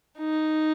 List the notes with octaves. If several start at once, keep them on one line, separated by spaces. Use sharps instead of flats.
D#4